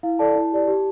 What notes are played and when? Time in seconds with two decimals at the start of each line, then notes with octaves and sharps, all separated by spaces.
0.03 E4 F5
0.19 A4 D5 A5
0.36 E4
0.52 G4 D5
0.67 G4